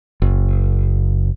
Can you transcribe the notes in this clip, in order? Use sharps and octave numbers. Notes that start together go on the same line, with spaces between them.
F#1